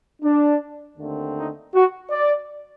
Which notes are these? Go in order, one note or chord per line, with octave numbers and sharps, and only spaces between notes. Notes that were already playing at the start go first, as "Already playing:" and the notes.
D4
D#2 D3 A3 C4
D#4
F#4
D5